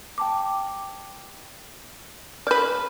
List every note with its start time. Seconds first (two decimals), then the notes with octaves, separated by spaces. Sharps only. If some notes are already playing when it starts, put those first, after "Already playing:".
0.18 G5 A5 D6
2.47 B4 D5 F6 G6